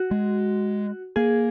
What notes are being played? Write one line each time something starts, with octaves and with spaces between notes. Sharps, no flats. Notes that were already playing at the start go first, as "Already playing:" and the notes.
Already playing: F#4
G#3
A#3 G#4